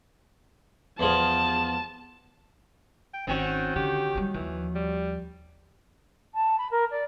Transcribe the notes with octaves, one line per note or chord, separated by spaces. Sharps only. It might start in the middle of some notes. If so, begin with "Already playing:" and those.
E2 F3 G#4 A5
G5
G#1 D#3 C4 C#4 F#4
D3 G4
F#3 G3
D#2 E3 F3
G3
A5
B5
A#4
D5